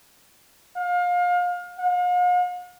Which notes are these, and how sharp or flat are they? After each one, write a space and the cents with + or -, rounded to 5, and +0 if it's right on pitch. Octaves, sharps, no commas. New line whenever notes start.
F5 +30
F5 +45